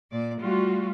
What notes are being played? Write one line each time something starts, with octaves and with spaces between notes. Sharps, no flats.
A#2 D5
G3 A3 F4 F#4